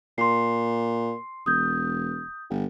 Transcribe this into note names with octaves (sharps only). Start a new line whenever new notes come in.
A#2 C6 C7
E1 D#6 G6
G1